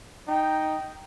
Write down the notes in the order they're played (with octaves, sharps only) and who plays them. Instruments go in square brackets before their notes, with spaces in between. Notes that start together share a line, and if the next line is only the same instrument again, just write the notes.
[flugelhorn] D#4 [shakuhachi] G5